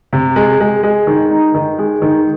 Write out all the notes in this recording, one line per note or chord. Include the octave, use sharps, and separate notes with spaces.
C3
G#3
G#3
G#3
D#3
D#4
D#3
G#3
D#3